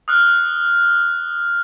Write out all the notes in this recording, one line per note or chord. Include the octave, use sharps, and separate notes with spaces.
D#6 F6 F#6